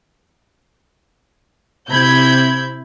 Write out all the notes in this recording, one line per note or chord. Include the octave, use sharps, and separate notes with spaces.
C3 E4 B5 G6 G#6